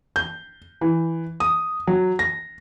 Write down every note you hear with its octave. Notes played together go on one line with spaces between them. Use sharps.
G6
E3
D#6
F#3
A#6